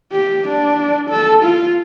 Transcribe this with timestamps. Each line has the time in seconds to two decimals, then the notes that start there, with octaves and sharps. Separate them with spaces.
0.12 G4
0.48 D4
1.10 A4
1.44 F4